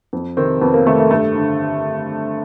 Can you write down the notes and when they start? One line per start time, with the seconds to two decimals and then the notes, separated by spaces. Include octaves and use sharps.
0.13 F2
0.37 C3 D#3 C4
0.61 F2 B3
0.74 A#3
0.87 C3 D#3 A3
0.99 A3
1.11 G2 A3
1.36 D3